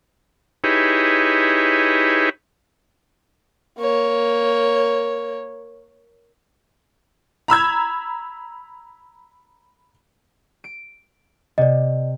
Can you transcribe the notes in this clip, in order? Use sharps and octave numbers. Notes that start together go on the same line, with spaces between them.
D#4 E4 G4 G#4 B4 C#5
A#3 C#5
A#5 B5 E6 G#6
D7
C3 D5 D#5